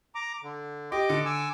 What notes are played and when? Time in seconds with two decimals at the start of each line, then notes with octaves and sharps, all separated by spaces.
0.15 A#5 D6
0.43 D3
0.92 G4 D#5 D6
1.09 D3 D7
1.25 G#5 D6 E6